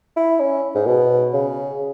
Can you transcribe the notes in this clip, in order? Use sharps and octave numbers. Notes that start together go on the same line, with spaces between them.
E4
C#4
G#2
B2
C#3